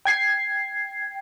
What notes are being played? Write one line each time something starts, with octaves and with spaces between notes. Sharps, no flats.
G5 G#6 C7